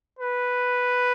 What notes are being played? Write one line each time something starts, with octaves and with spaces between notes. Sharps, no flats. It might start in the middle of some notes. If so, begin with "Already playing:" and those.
B4